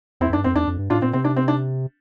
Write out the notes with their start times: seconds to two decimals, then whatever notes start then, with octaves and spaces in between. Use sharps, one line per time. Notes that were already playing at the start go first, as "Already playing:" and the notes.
0.20 E2 C4 E4
0.30 F2
0.33 D4
0.38 G2
0.44 F2 C4
0.55 E2 D4
0.67 F2
0.79 G2
0.90 A2 D4 F4
1.02 A#2 C4
1.13 C3 C4
1.24 D4
1.36 C4
1.48 D4